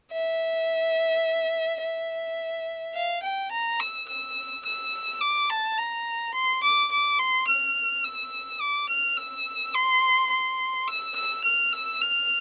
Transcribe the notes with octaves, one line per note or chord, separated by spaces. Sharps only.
E5
E5
F5
G5
A#5
E6
E6
E6
D6
A5
A#5
C6
D6
D6
C6
F6
E6
D6
F6
E6
C6
C6
E6
E6
F6
E6
F6